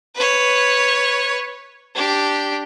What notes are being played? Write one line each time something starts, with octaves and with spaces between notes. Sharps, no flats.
B4 C#5
D4 G4